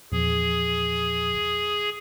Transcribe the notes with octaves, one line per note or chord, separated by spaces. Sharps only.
E2 A#2 F3 G#4